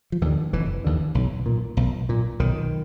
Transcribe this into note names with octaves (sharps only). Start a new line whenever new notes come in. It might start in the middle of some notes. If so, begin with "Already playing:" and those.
F3
D#2 D3 E3
F1 E3
D#2 D3
B1
A#2
B1
A#2
B1 D#3